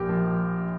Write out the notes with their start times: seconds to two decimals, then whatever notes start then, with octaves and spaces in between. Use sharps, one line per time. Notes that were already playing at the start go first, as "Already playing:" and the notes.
Already playing: A#1 A#2 G4 A#4
0.09 F3